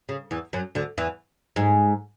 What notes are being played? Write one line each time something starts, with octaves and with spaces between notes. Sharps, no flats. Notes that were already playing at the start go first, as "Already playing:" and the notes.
C#3
E2 E3
F#2 F#3
D2 D3
E2 E3
G#2 G#3